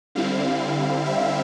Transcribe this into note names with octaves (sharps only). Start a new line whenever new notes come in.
D3 G3 C4 E4 F5
E5